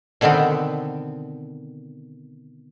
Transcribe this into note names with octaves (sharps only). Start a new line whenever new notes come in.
B2 D3 D#3 B3 C4